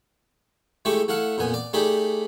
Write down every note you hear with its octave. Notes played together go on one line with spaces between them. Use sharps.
G#3 A3 E4 G4 C#6 D6
A3 E4 F5 F#5
F2 A#2 B3 G#5
D5
A3 D#4 G4 G#4 D5 B5